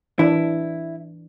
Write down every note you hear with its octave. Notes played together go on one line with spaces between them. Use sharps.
E3 D4 E4